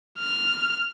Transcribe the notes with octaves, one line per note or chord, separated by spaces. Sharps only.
F6